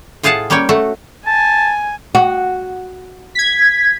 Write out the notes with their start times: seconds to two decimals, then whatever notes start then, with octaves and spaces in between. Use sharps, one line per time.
0.23 A2 F4 G#4 F5 F#5 A5
0.50 G3 A#3 C#4 C#5 G5
0.69 A3 F#4 A4
1.27 G#5 A5
2.15 F#4
3.35 G#6 B6